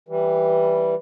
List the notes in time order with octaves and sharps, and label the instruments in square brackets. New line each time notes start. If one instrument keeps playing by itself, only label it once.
[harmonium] E3 G3